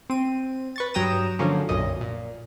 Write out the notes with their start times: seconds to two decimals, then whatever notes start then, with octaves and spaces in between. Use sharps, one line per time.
0.10 C4 D#7
0.76 B4 C#6 A6
0.94 G2 F#3 G5 A#5 D#6 E7
1.39 D3 F3 F#3 A#3 C#4
1.69 B1 F#2 A#2 D#5
2.01 A#2